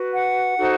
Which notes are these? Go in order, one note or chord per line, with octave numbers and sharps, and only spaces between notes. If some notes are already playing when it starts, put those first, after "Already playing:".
Already playing: F#4 B4
F#5
D#4 F#4 A4 C5